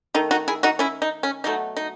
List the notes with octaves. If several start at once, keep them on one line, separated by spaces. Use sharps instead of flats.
D#3 A3 D#4
D#4 F#4
E4 G#4
D#4 F#4
C#4 E4
D#4
C#4
B2 F#3 A3 D#4
D#4